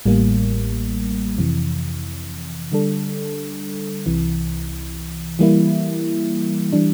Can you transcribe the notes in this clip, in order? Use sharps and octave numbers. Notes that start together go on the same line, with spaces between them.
A1 A2 G3 A#3
F2 C3 E3
D3 G3 D4 A4
C2 C3 E3
E3 G3 A#3 E4
E3 G3 D4